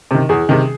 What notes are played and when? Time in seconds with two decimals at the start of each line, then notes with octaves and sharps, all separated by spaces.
0.11 C3 D#3
0.29 E2 G#4
0.49 C3 D#3